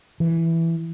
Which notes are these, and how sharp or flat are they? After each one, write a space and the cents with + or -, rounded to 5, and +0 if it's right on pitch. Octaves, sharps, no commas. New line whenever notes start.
E3 +5